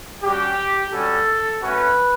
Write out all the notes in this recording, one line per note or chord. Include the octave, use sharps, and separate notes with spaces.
G3 C#4 F#4 G4
G3 C#4 F#4 A4
A3 C#4 F#4 B4